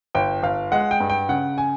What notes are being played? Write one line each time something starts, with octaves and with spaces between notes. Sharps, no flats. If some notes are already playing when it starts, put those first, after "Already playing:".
G1 G5
G1 F5
G#3 F#5
G5
G2
G5
C#3 F#5
G#5